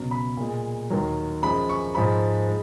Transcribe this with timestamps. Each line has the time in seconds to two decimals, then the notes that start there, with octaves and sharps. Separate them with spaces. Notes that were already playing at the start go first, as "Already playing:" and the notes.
Already playing: C#2 B2 F#3
0.11 B5
0.37 A#2 G#3
0.90 D#2 D#3 F#3
1.43 F#2 F3 G#3 B5
1.69 C#6
1.95 G#2 F3 G#3 B5
2.48 G#3